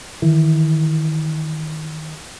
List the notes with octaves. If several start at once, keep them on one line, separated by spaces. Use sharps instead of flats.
D#3 E3